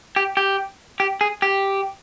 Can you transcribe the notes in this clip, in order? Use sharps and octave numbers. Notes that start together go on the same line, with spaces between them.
G4
G4
G4
G#4
G4